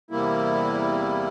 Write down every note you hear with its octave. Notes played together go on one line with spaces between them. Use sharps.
E2 C3 G3 A#3 E4